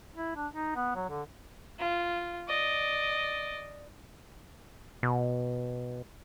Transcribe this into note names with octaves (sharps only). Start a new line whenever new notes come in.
E4
D4
D#4
B3
F#3
D3
F4
D5 D#5
B2